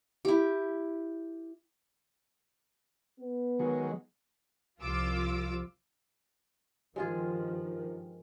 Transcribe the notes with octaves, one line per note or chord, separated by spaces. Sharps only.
E4 G4
B3
D#3 F#3 G#3
C2 F3 F4 D6 E6
G2 D#3 F3 G#3 F4 G#4